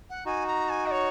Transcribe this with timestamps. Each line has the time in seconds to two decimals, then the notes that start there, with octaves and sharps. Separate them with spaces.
0.09 F#5
0.25 D#4 F#4 G#5
0.47 A#5
0.69 G#5
0.86 D#5
0.91 C#5